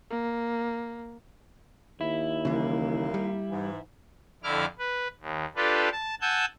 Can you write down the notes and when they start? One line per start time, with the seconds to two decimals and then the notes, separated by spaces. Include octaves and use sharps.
0.11 A#3
2.01 D#2 E4
2.45 C2 C#3 E3 A#3
3.14 G3
3.51 G#2 E3
4.43 F2 D3 E4 D6 F6
4.79 B4
5.21 D#2
5.56 D4 F4 G4 A4 B4
5.92 A5
6.21 F#5 G#5 A5 E6 G6